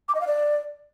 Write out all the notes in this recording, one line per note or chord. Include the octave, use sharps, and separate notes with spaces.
D6
D#5
F5
D5